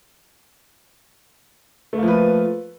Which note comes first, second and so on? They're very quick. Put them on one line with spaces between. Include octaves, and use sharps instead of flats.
A3 A#3 F3 B4